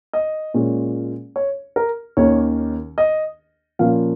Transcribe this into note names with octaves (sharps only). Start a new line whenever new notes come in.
D#5
A#2 G#3 C#4
C#5
A#4
D#2 D#3 A#3 C#4 C#5
D#5
A#2 F3 A#3 C#4 F5